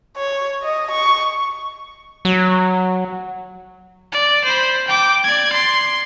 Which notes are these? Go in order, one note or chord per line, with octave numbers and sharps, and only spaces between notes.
C#5
D#5
C#6
F#3
D5
C5 B5
G5 D6
D5 G#6
C6